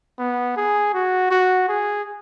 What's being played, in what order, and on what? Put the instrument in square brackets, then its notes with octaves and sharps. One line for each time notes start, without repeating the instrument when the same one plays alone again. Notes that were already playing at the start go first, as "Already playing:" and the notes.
[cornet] B3
G#4
F#4
F#4
G#4